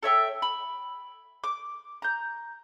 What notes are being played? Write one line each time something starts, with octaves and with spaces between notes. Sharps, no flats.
A4 C#5 E5 G5
B5
D6
A#5 G6